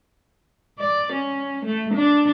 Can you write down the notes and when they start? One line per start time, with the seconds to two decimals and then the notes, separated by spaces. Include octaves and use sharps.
0.79 D5
1.13 C#4
1.66 A3
1.94 D4